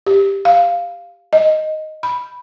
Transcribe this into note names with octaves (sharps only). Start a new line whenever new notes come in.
G4
F5
D#5
B5